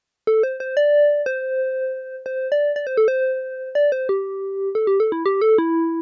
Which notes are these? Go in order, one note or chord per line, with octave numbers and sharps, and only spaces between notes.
A4
C5
C5
D5
C5
C5
D5
D5
C5
A4
C5
D5
C5
G4
A4
G4
A4
E4
G4
A4
E4